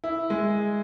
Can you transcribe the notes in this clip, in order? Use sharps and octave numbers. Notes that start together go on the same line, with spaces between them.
E4
G#3